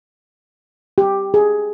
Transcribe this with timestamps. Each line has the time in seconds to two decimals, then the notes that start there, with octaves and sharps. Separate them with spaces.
0.98 G4
1.34 G#4